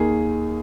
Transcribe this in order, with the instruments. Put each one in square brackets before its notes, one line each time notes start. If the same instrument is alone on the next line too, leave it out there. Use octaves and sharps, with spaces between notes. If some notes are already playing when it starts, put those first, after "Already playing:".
Already playing: [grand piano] D#2 D#3 A#3 G#4